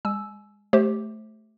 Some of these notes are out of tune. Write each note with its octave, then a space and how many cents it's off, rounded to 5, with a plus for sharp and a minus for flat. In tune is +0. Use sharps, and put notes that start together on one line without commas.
G#3 -30 G#5 +35 E6 +0
A3 -15 G4 +0 C5 +25